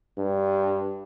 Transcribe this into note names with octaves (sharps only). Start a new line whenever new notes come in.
G2